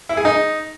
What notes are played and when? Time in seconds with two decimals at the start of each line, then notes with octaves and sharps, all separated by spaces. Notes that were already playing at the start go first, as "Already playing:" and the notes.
0.09 E4
0.17 G#4
0.25 D#4